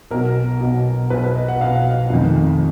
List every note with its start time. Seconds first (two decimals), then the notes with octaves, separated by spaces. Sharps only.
0.11 B1 B2 A#4
0.60 B1 B2
1.10 B1 B2 B4
1.23 B4
1.35 D#5
1.48 F#5
1.61 B1 B2 F5
2.10 F1 F2 D#3